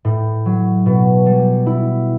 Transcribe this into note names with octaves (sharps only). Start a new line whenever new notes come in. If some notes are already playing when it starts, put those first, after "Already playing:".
A2
F#3
B2
G3
E4